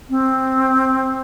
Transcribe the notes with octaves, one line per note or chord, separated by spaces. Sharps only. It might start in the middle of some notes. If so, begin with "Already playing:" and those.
C4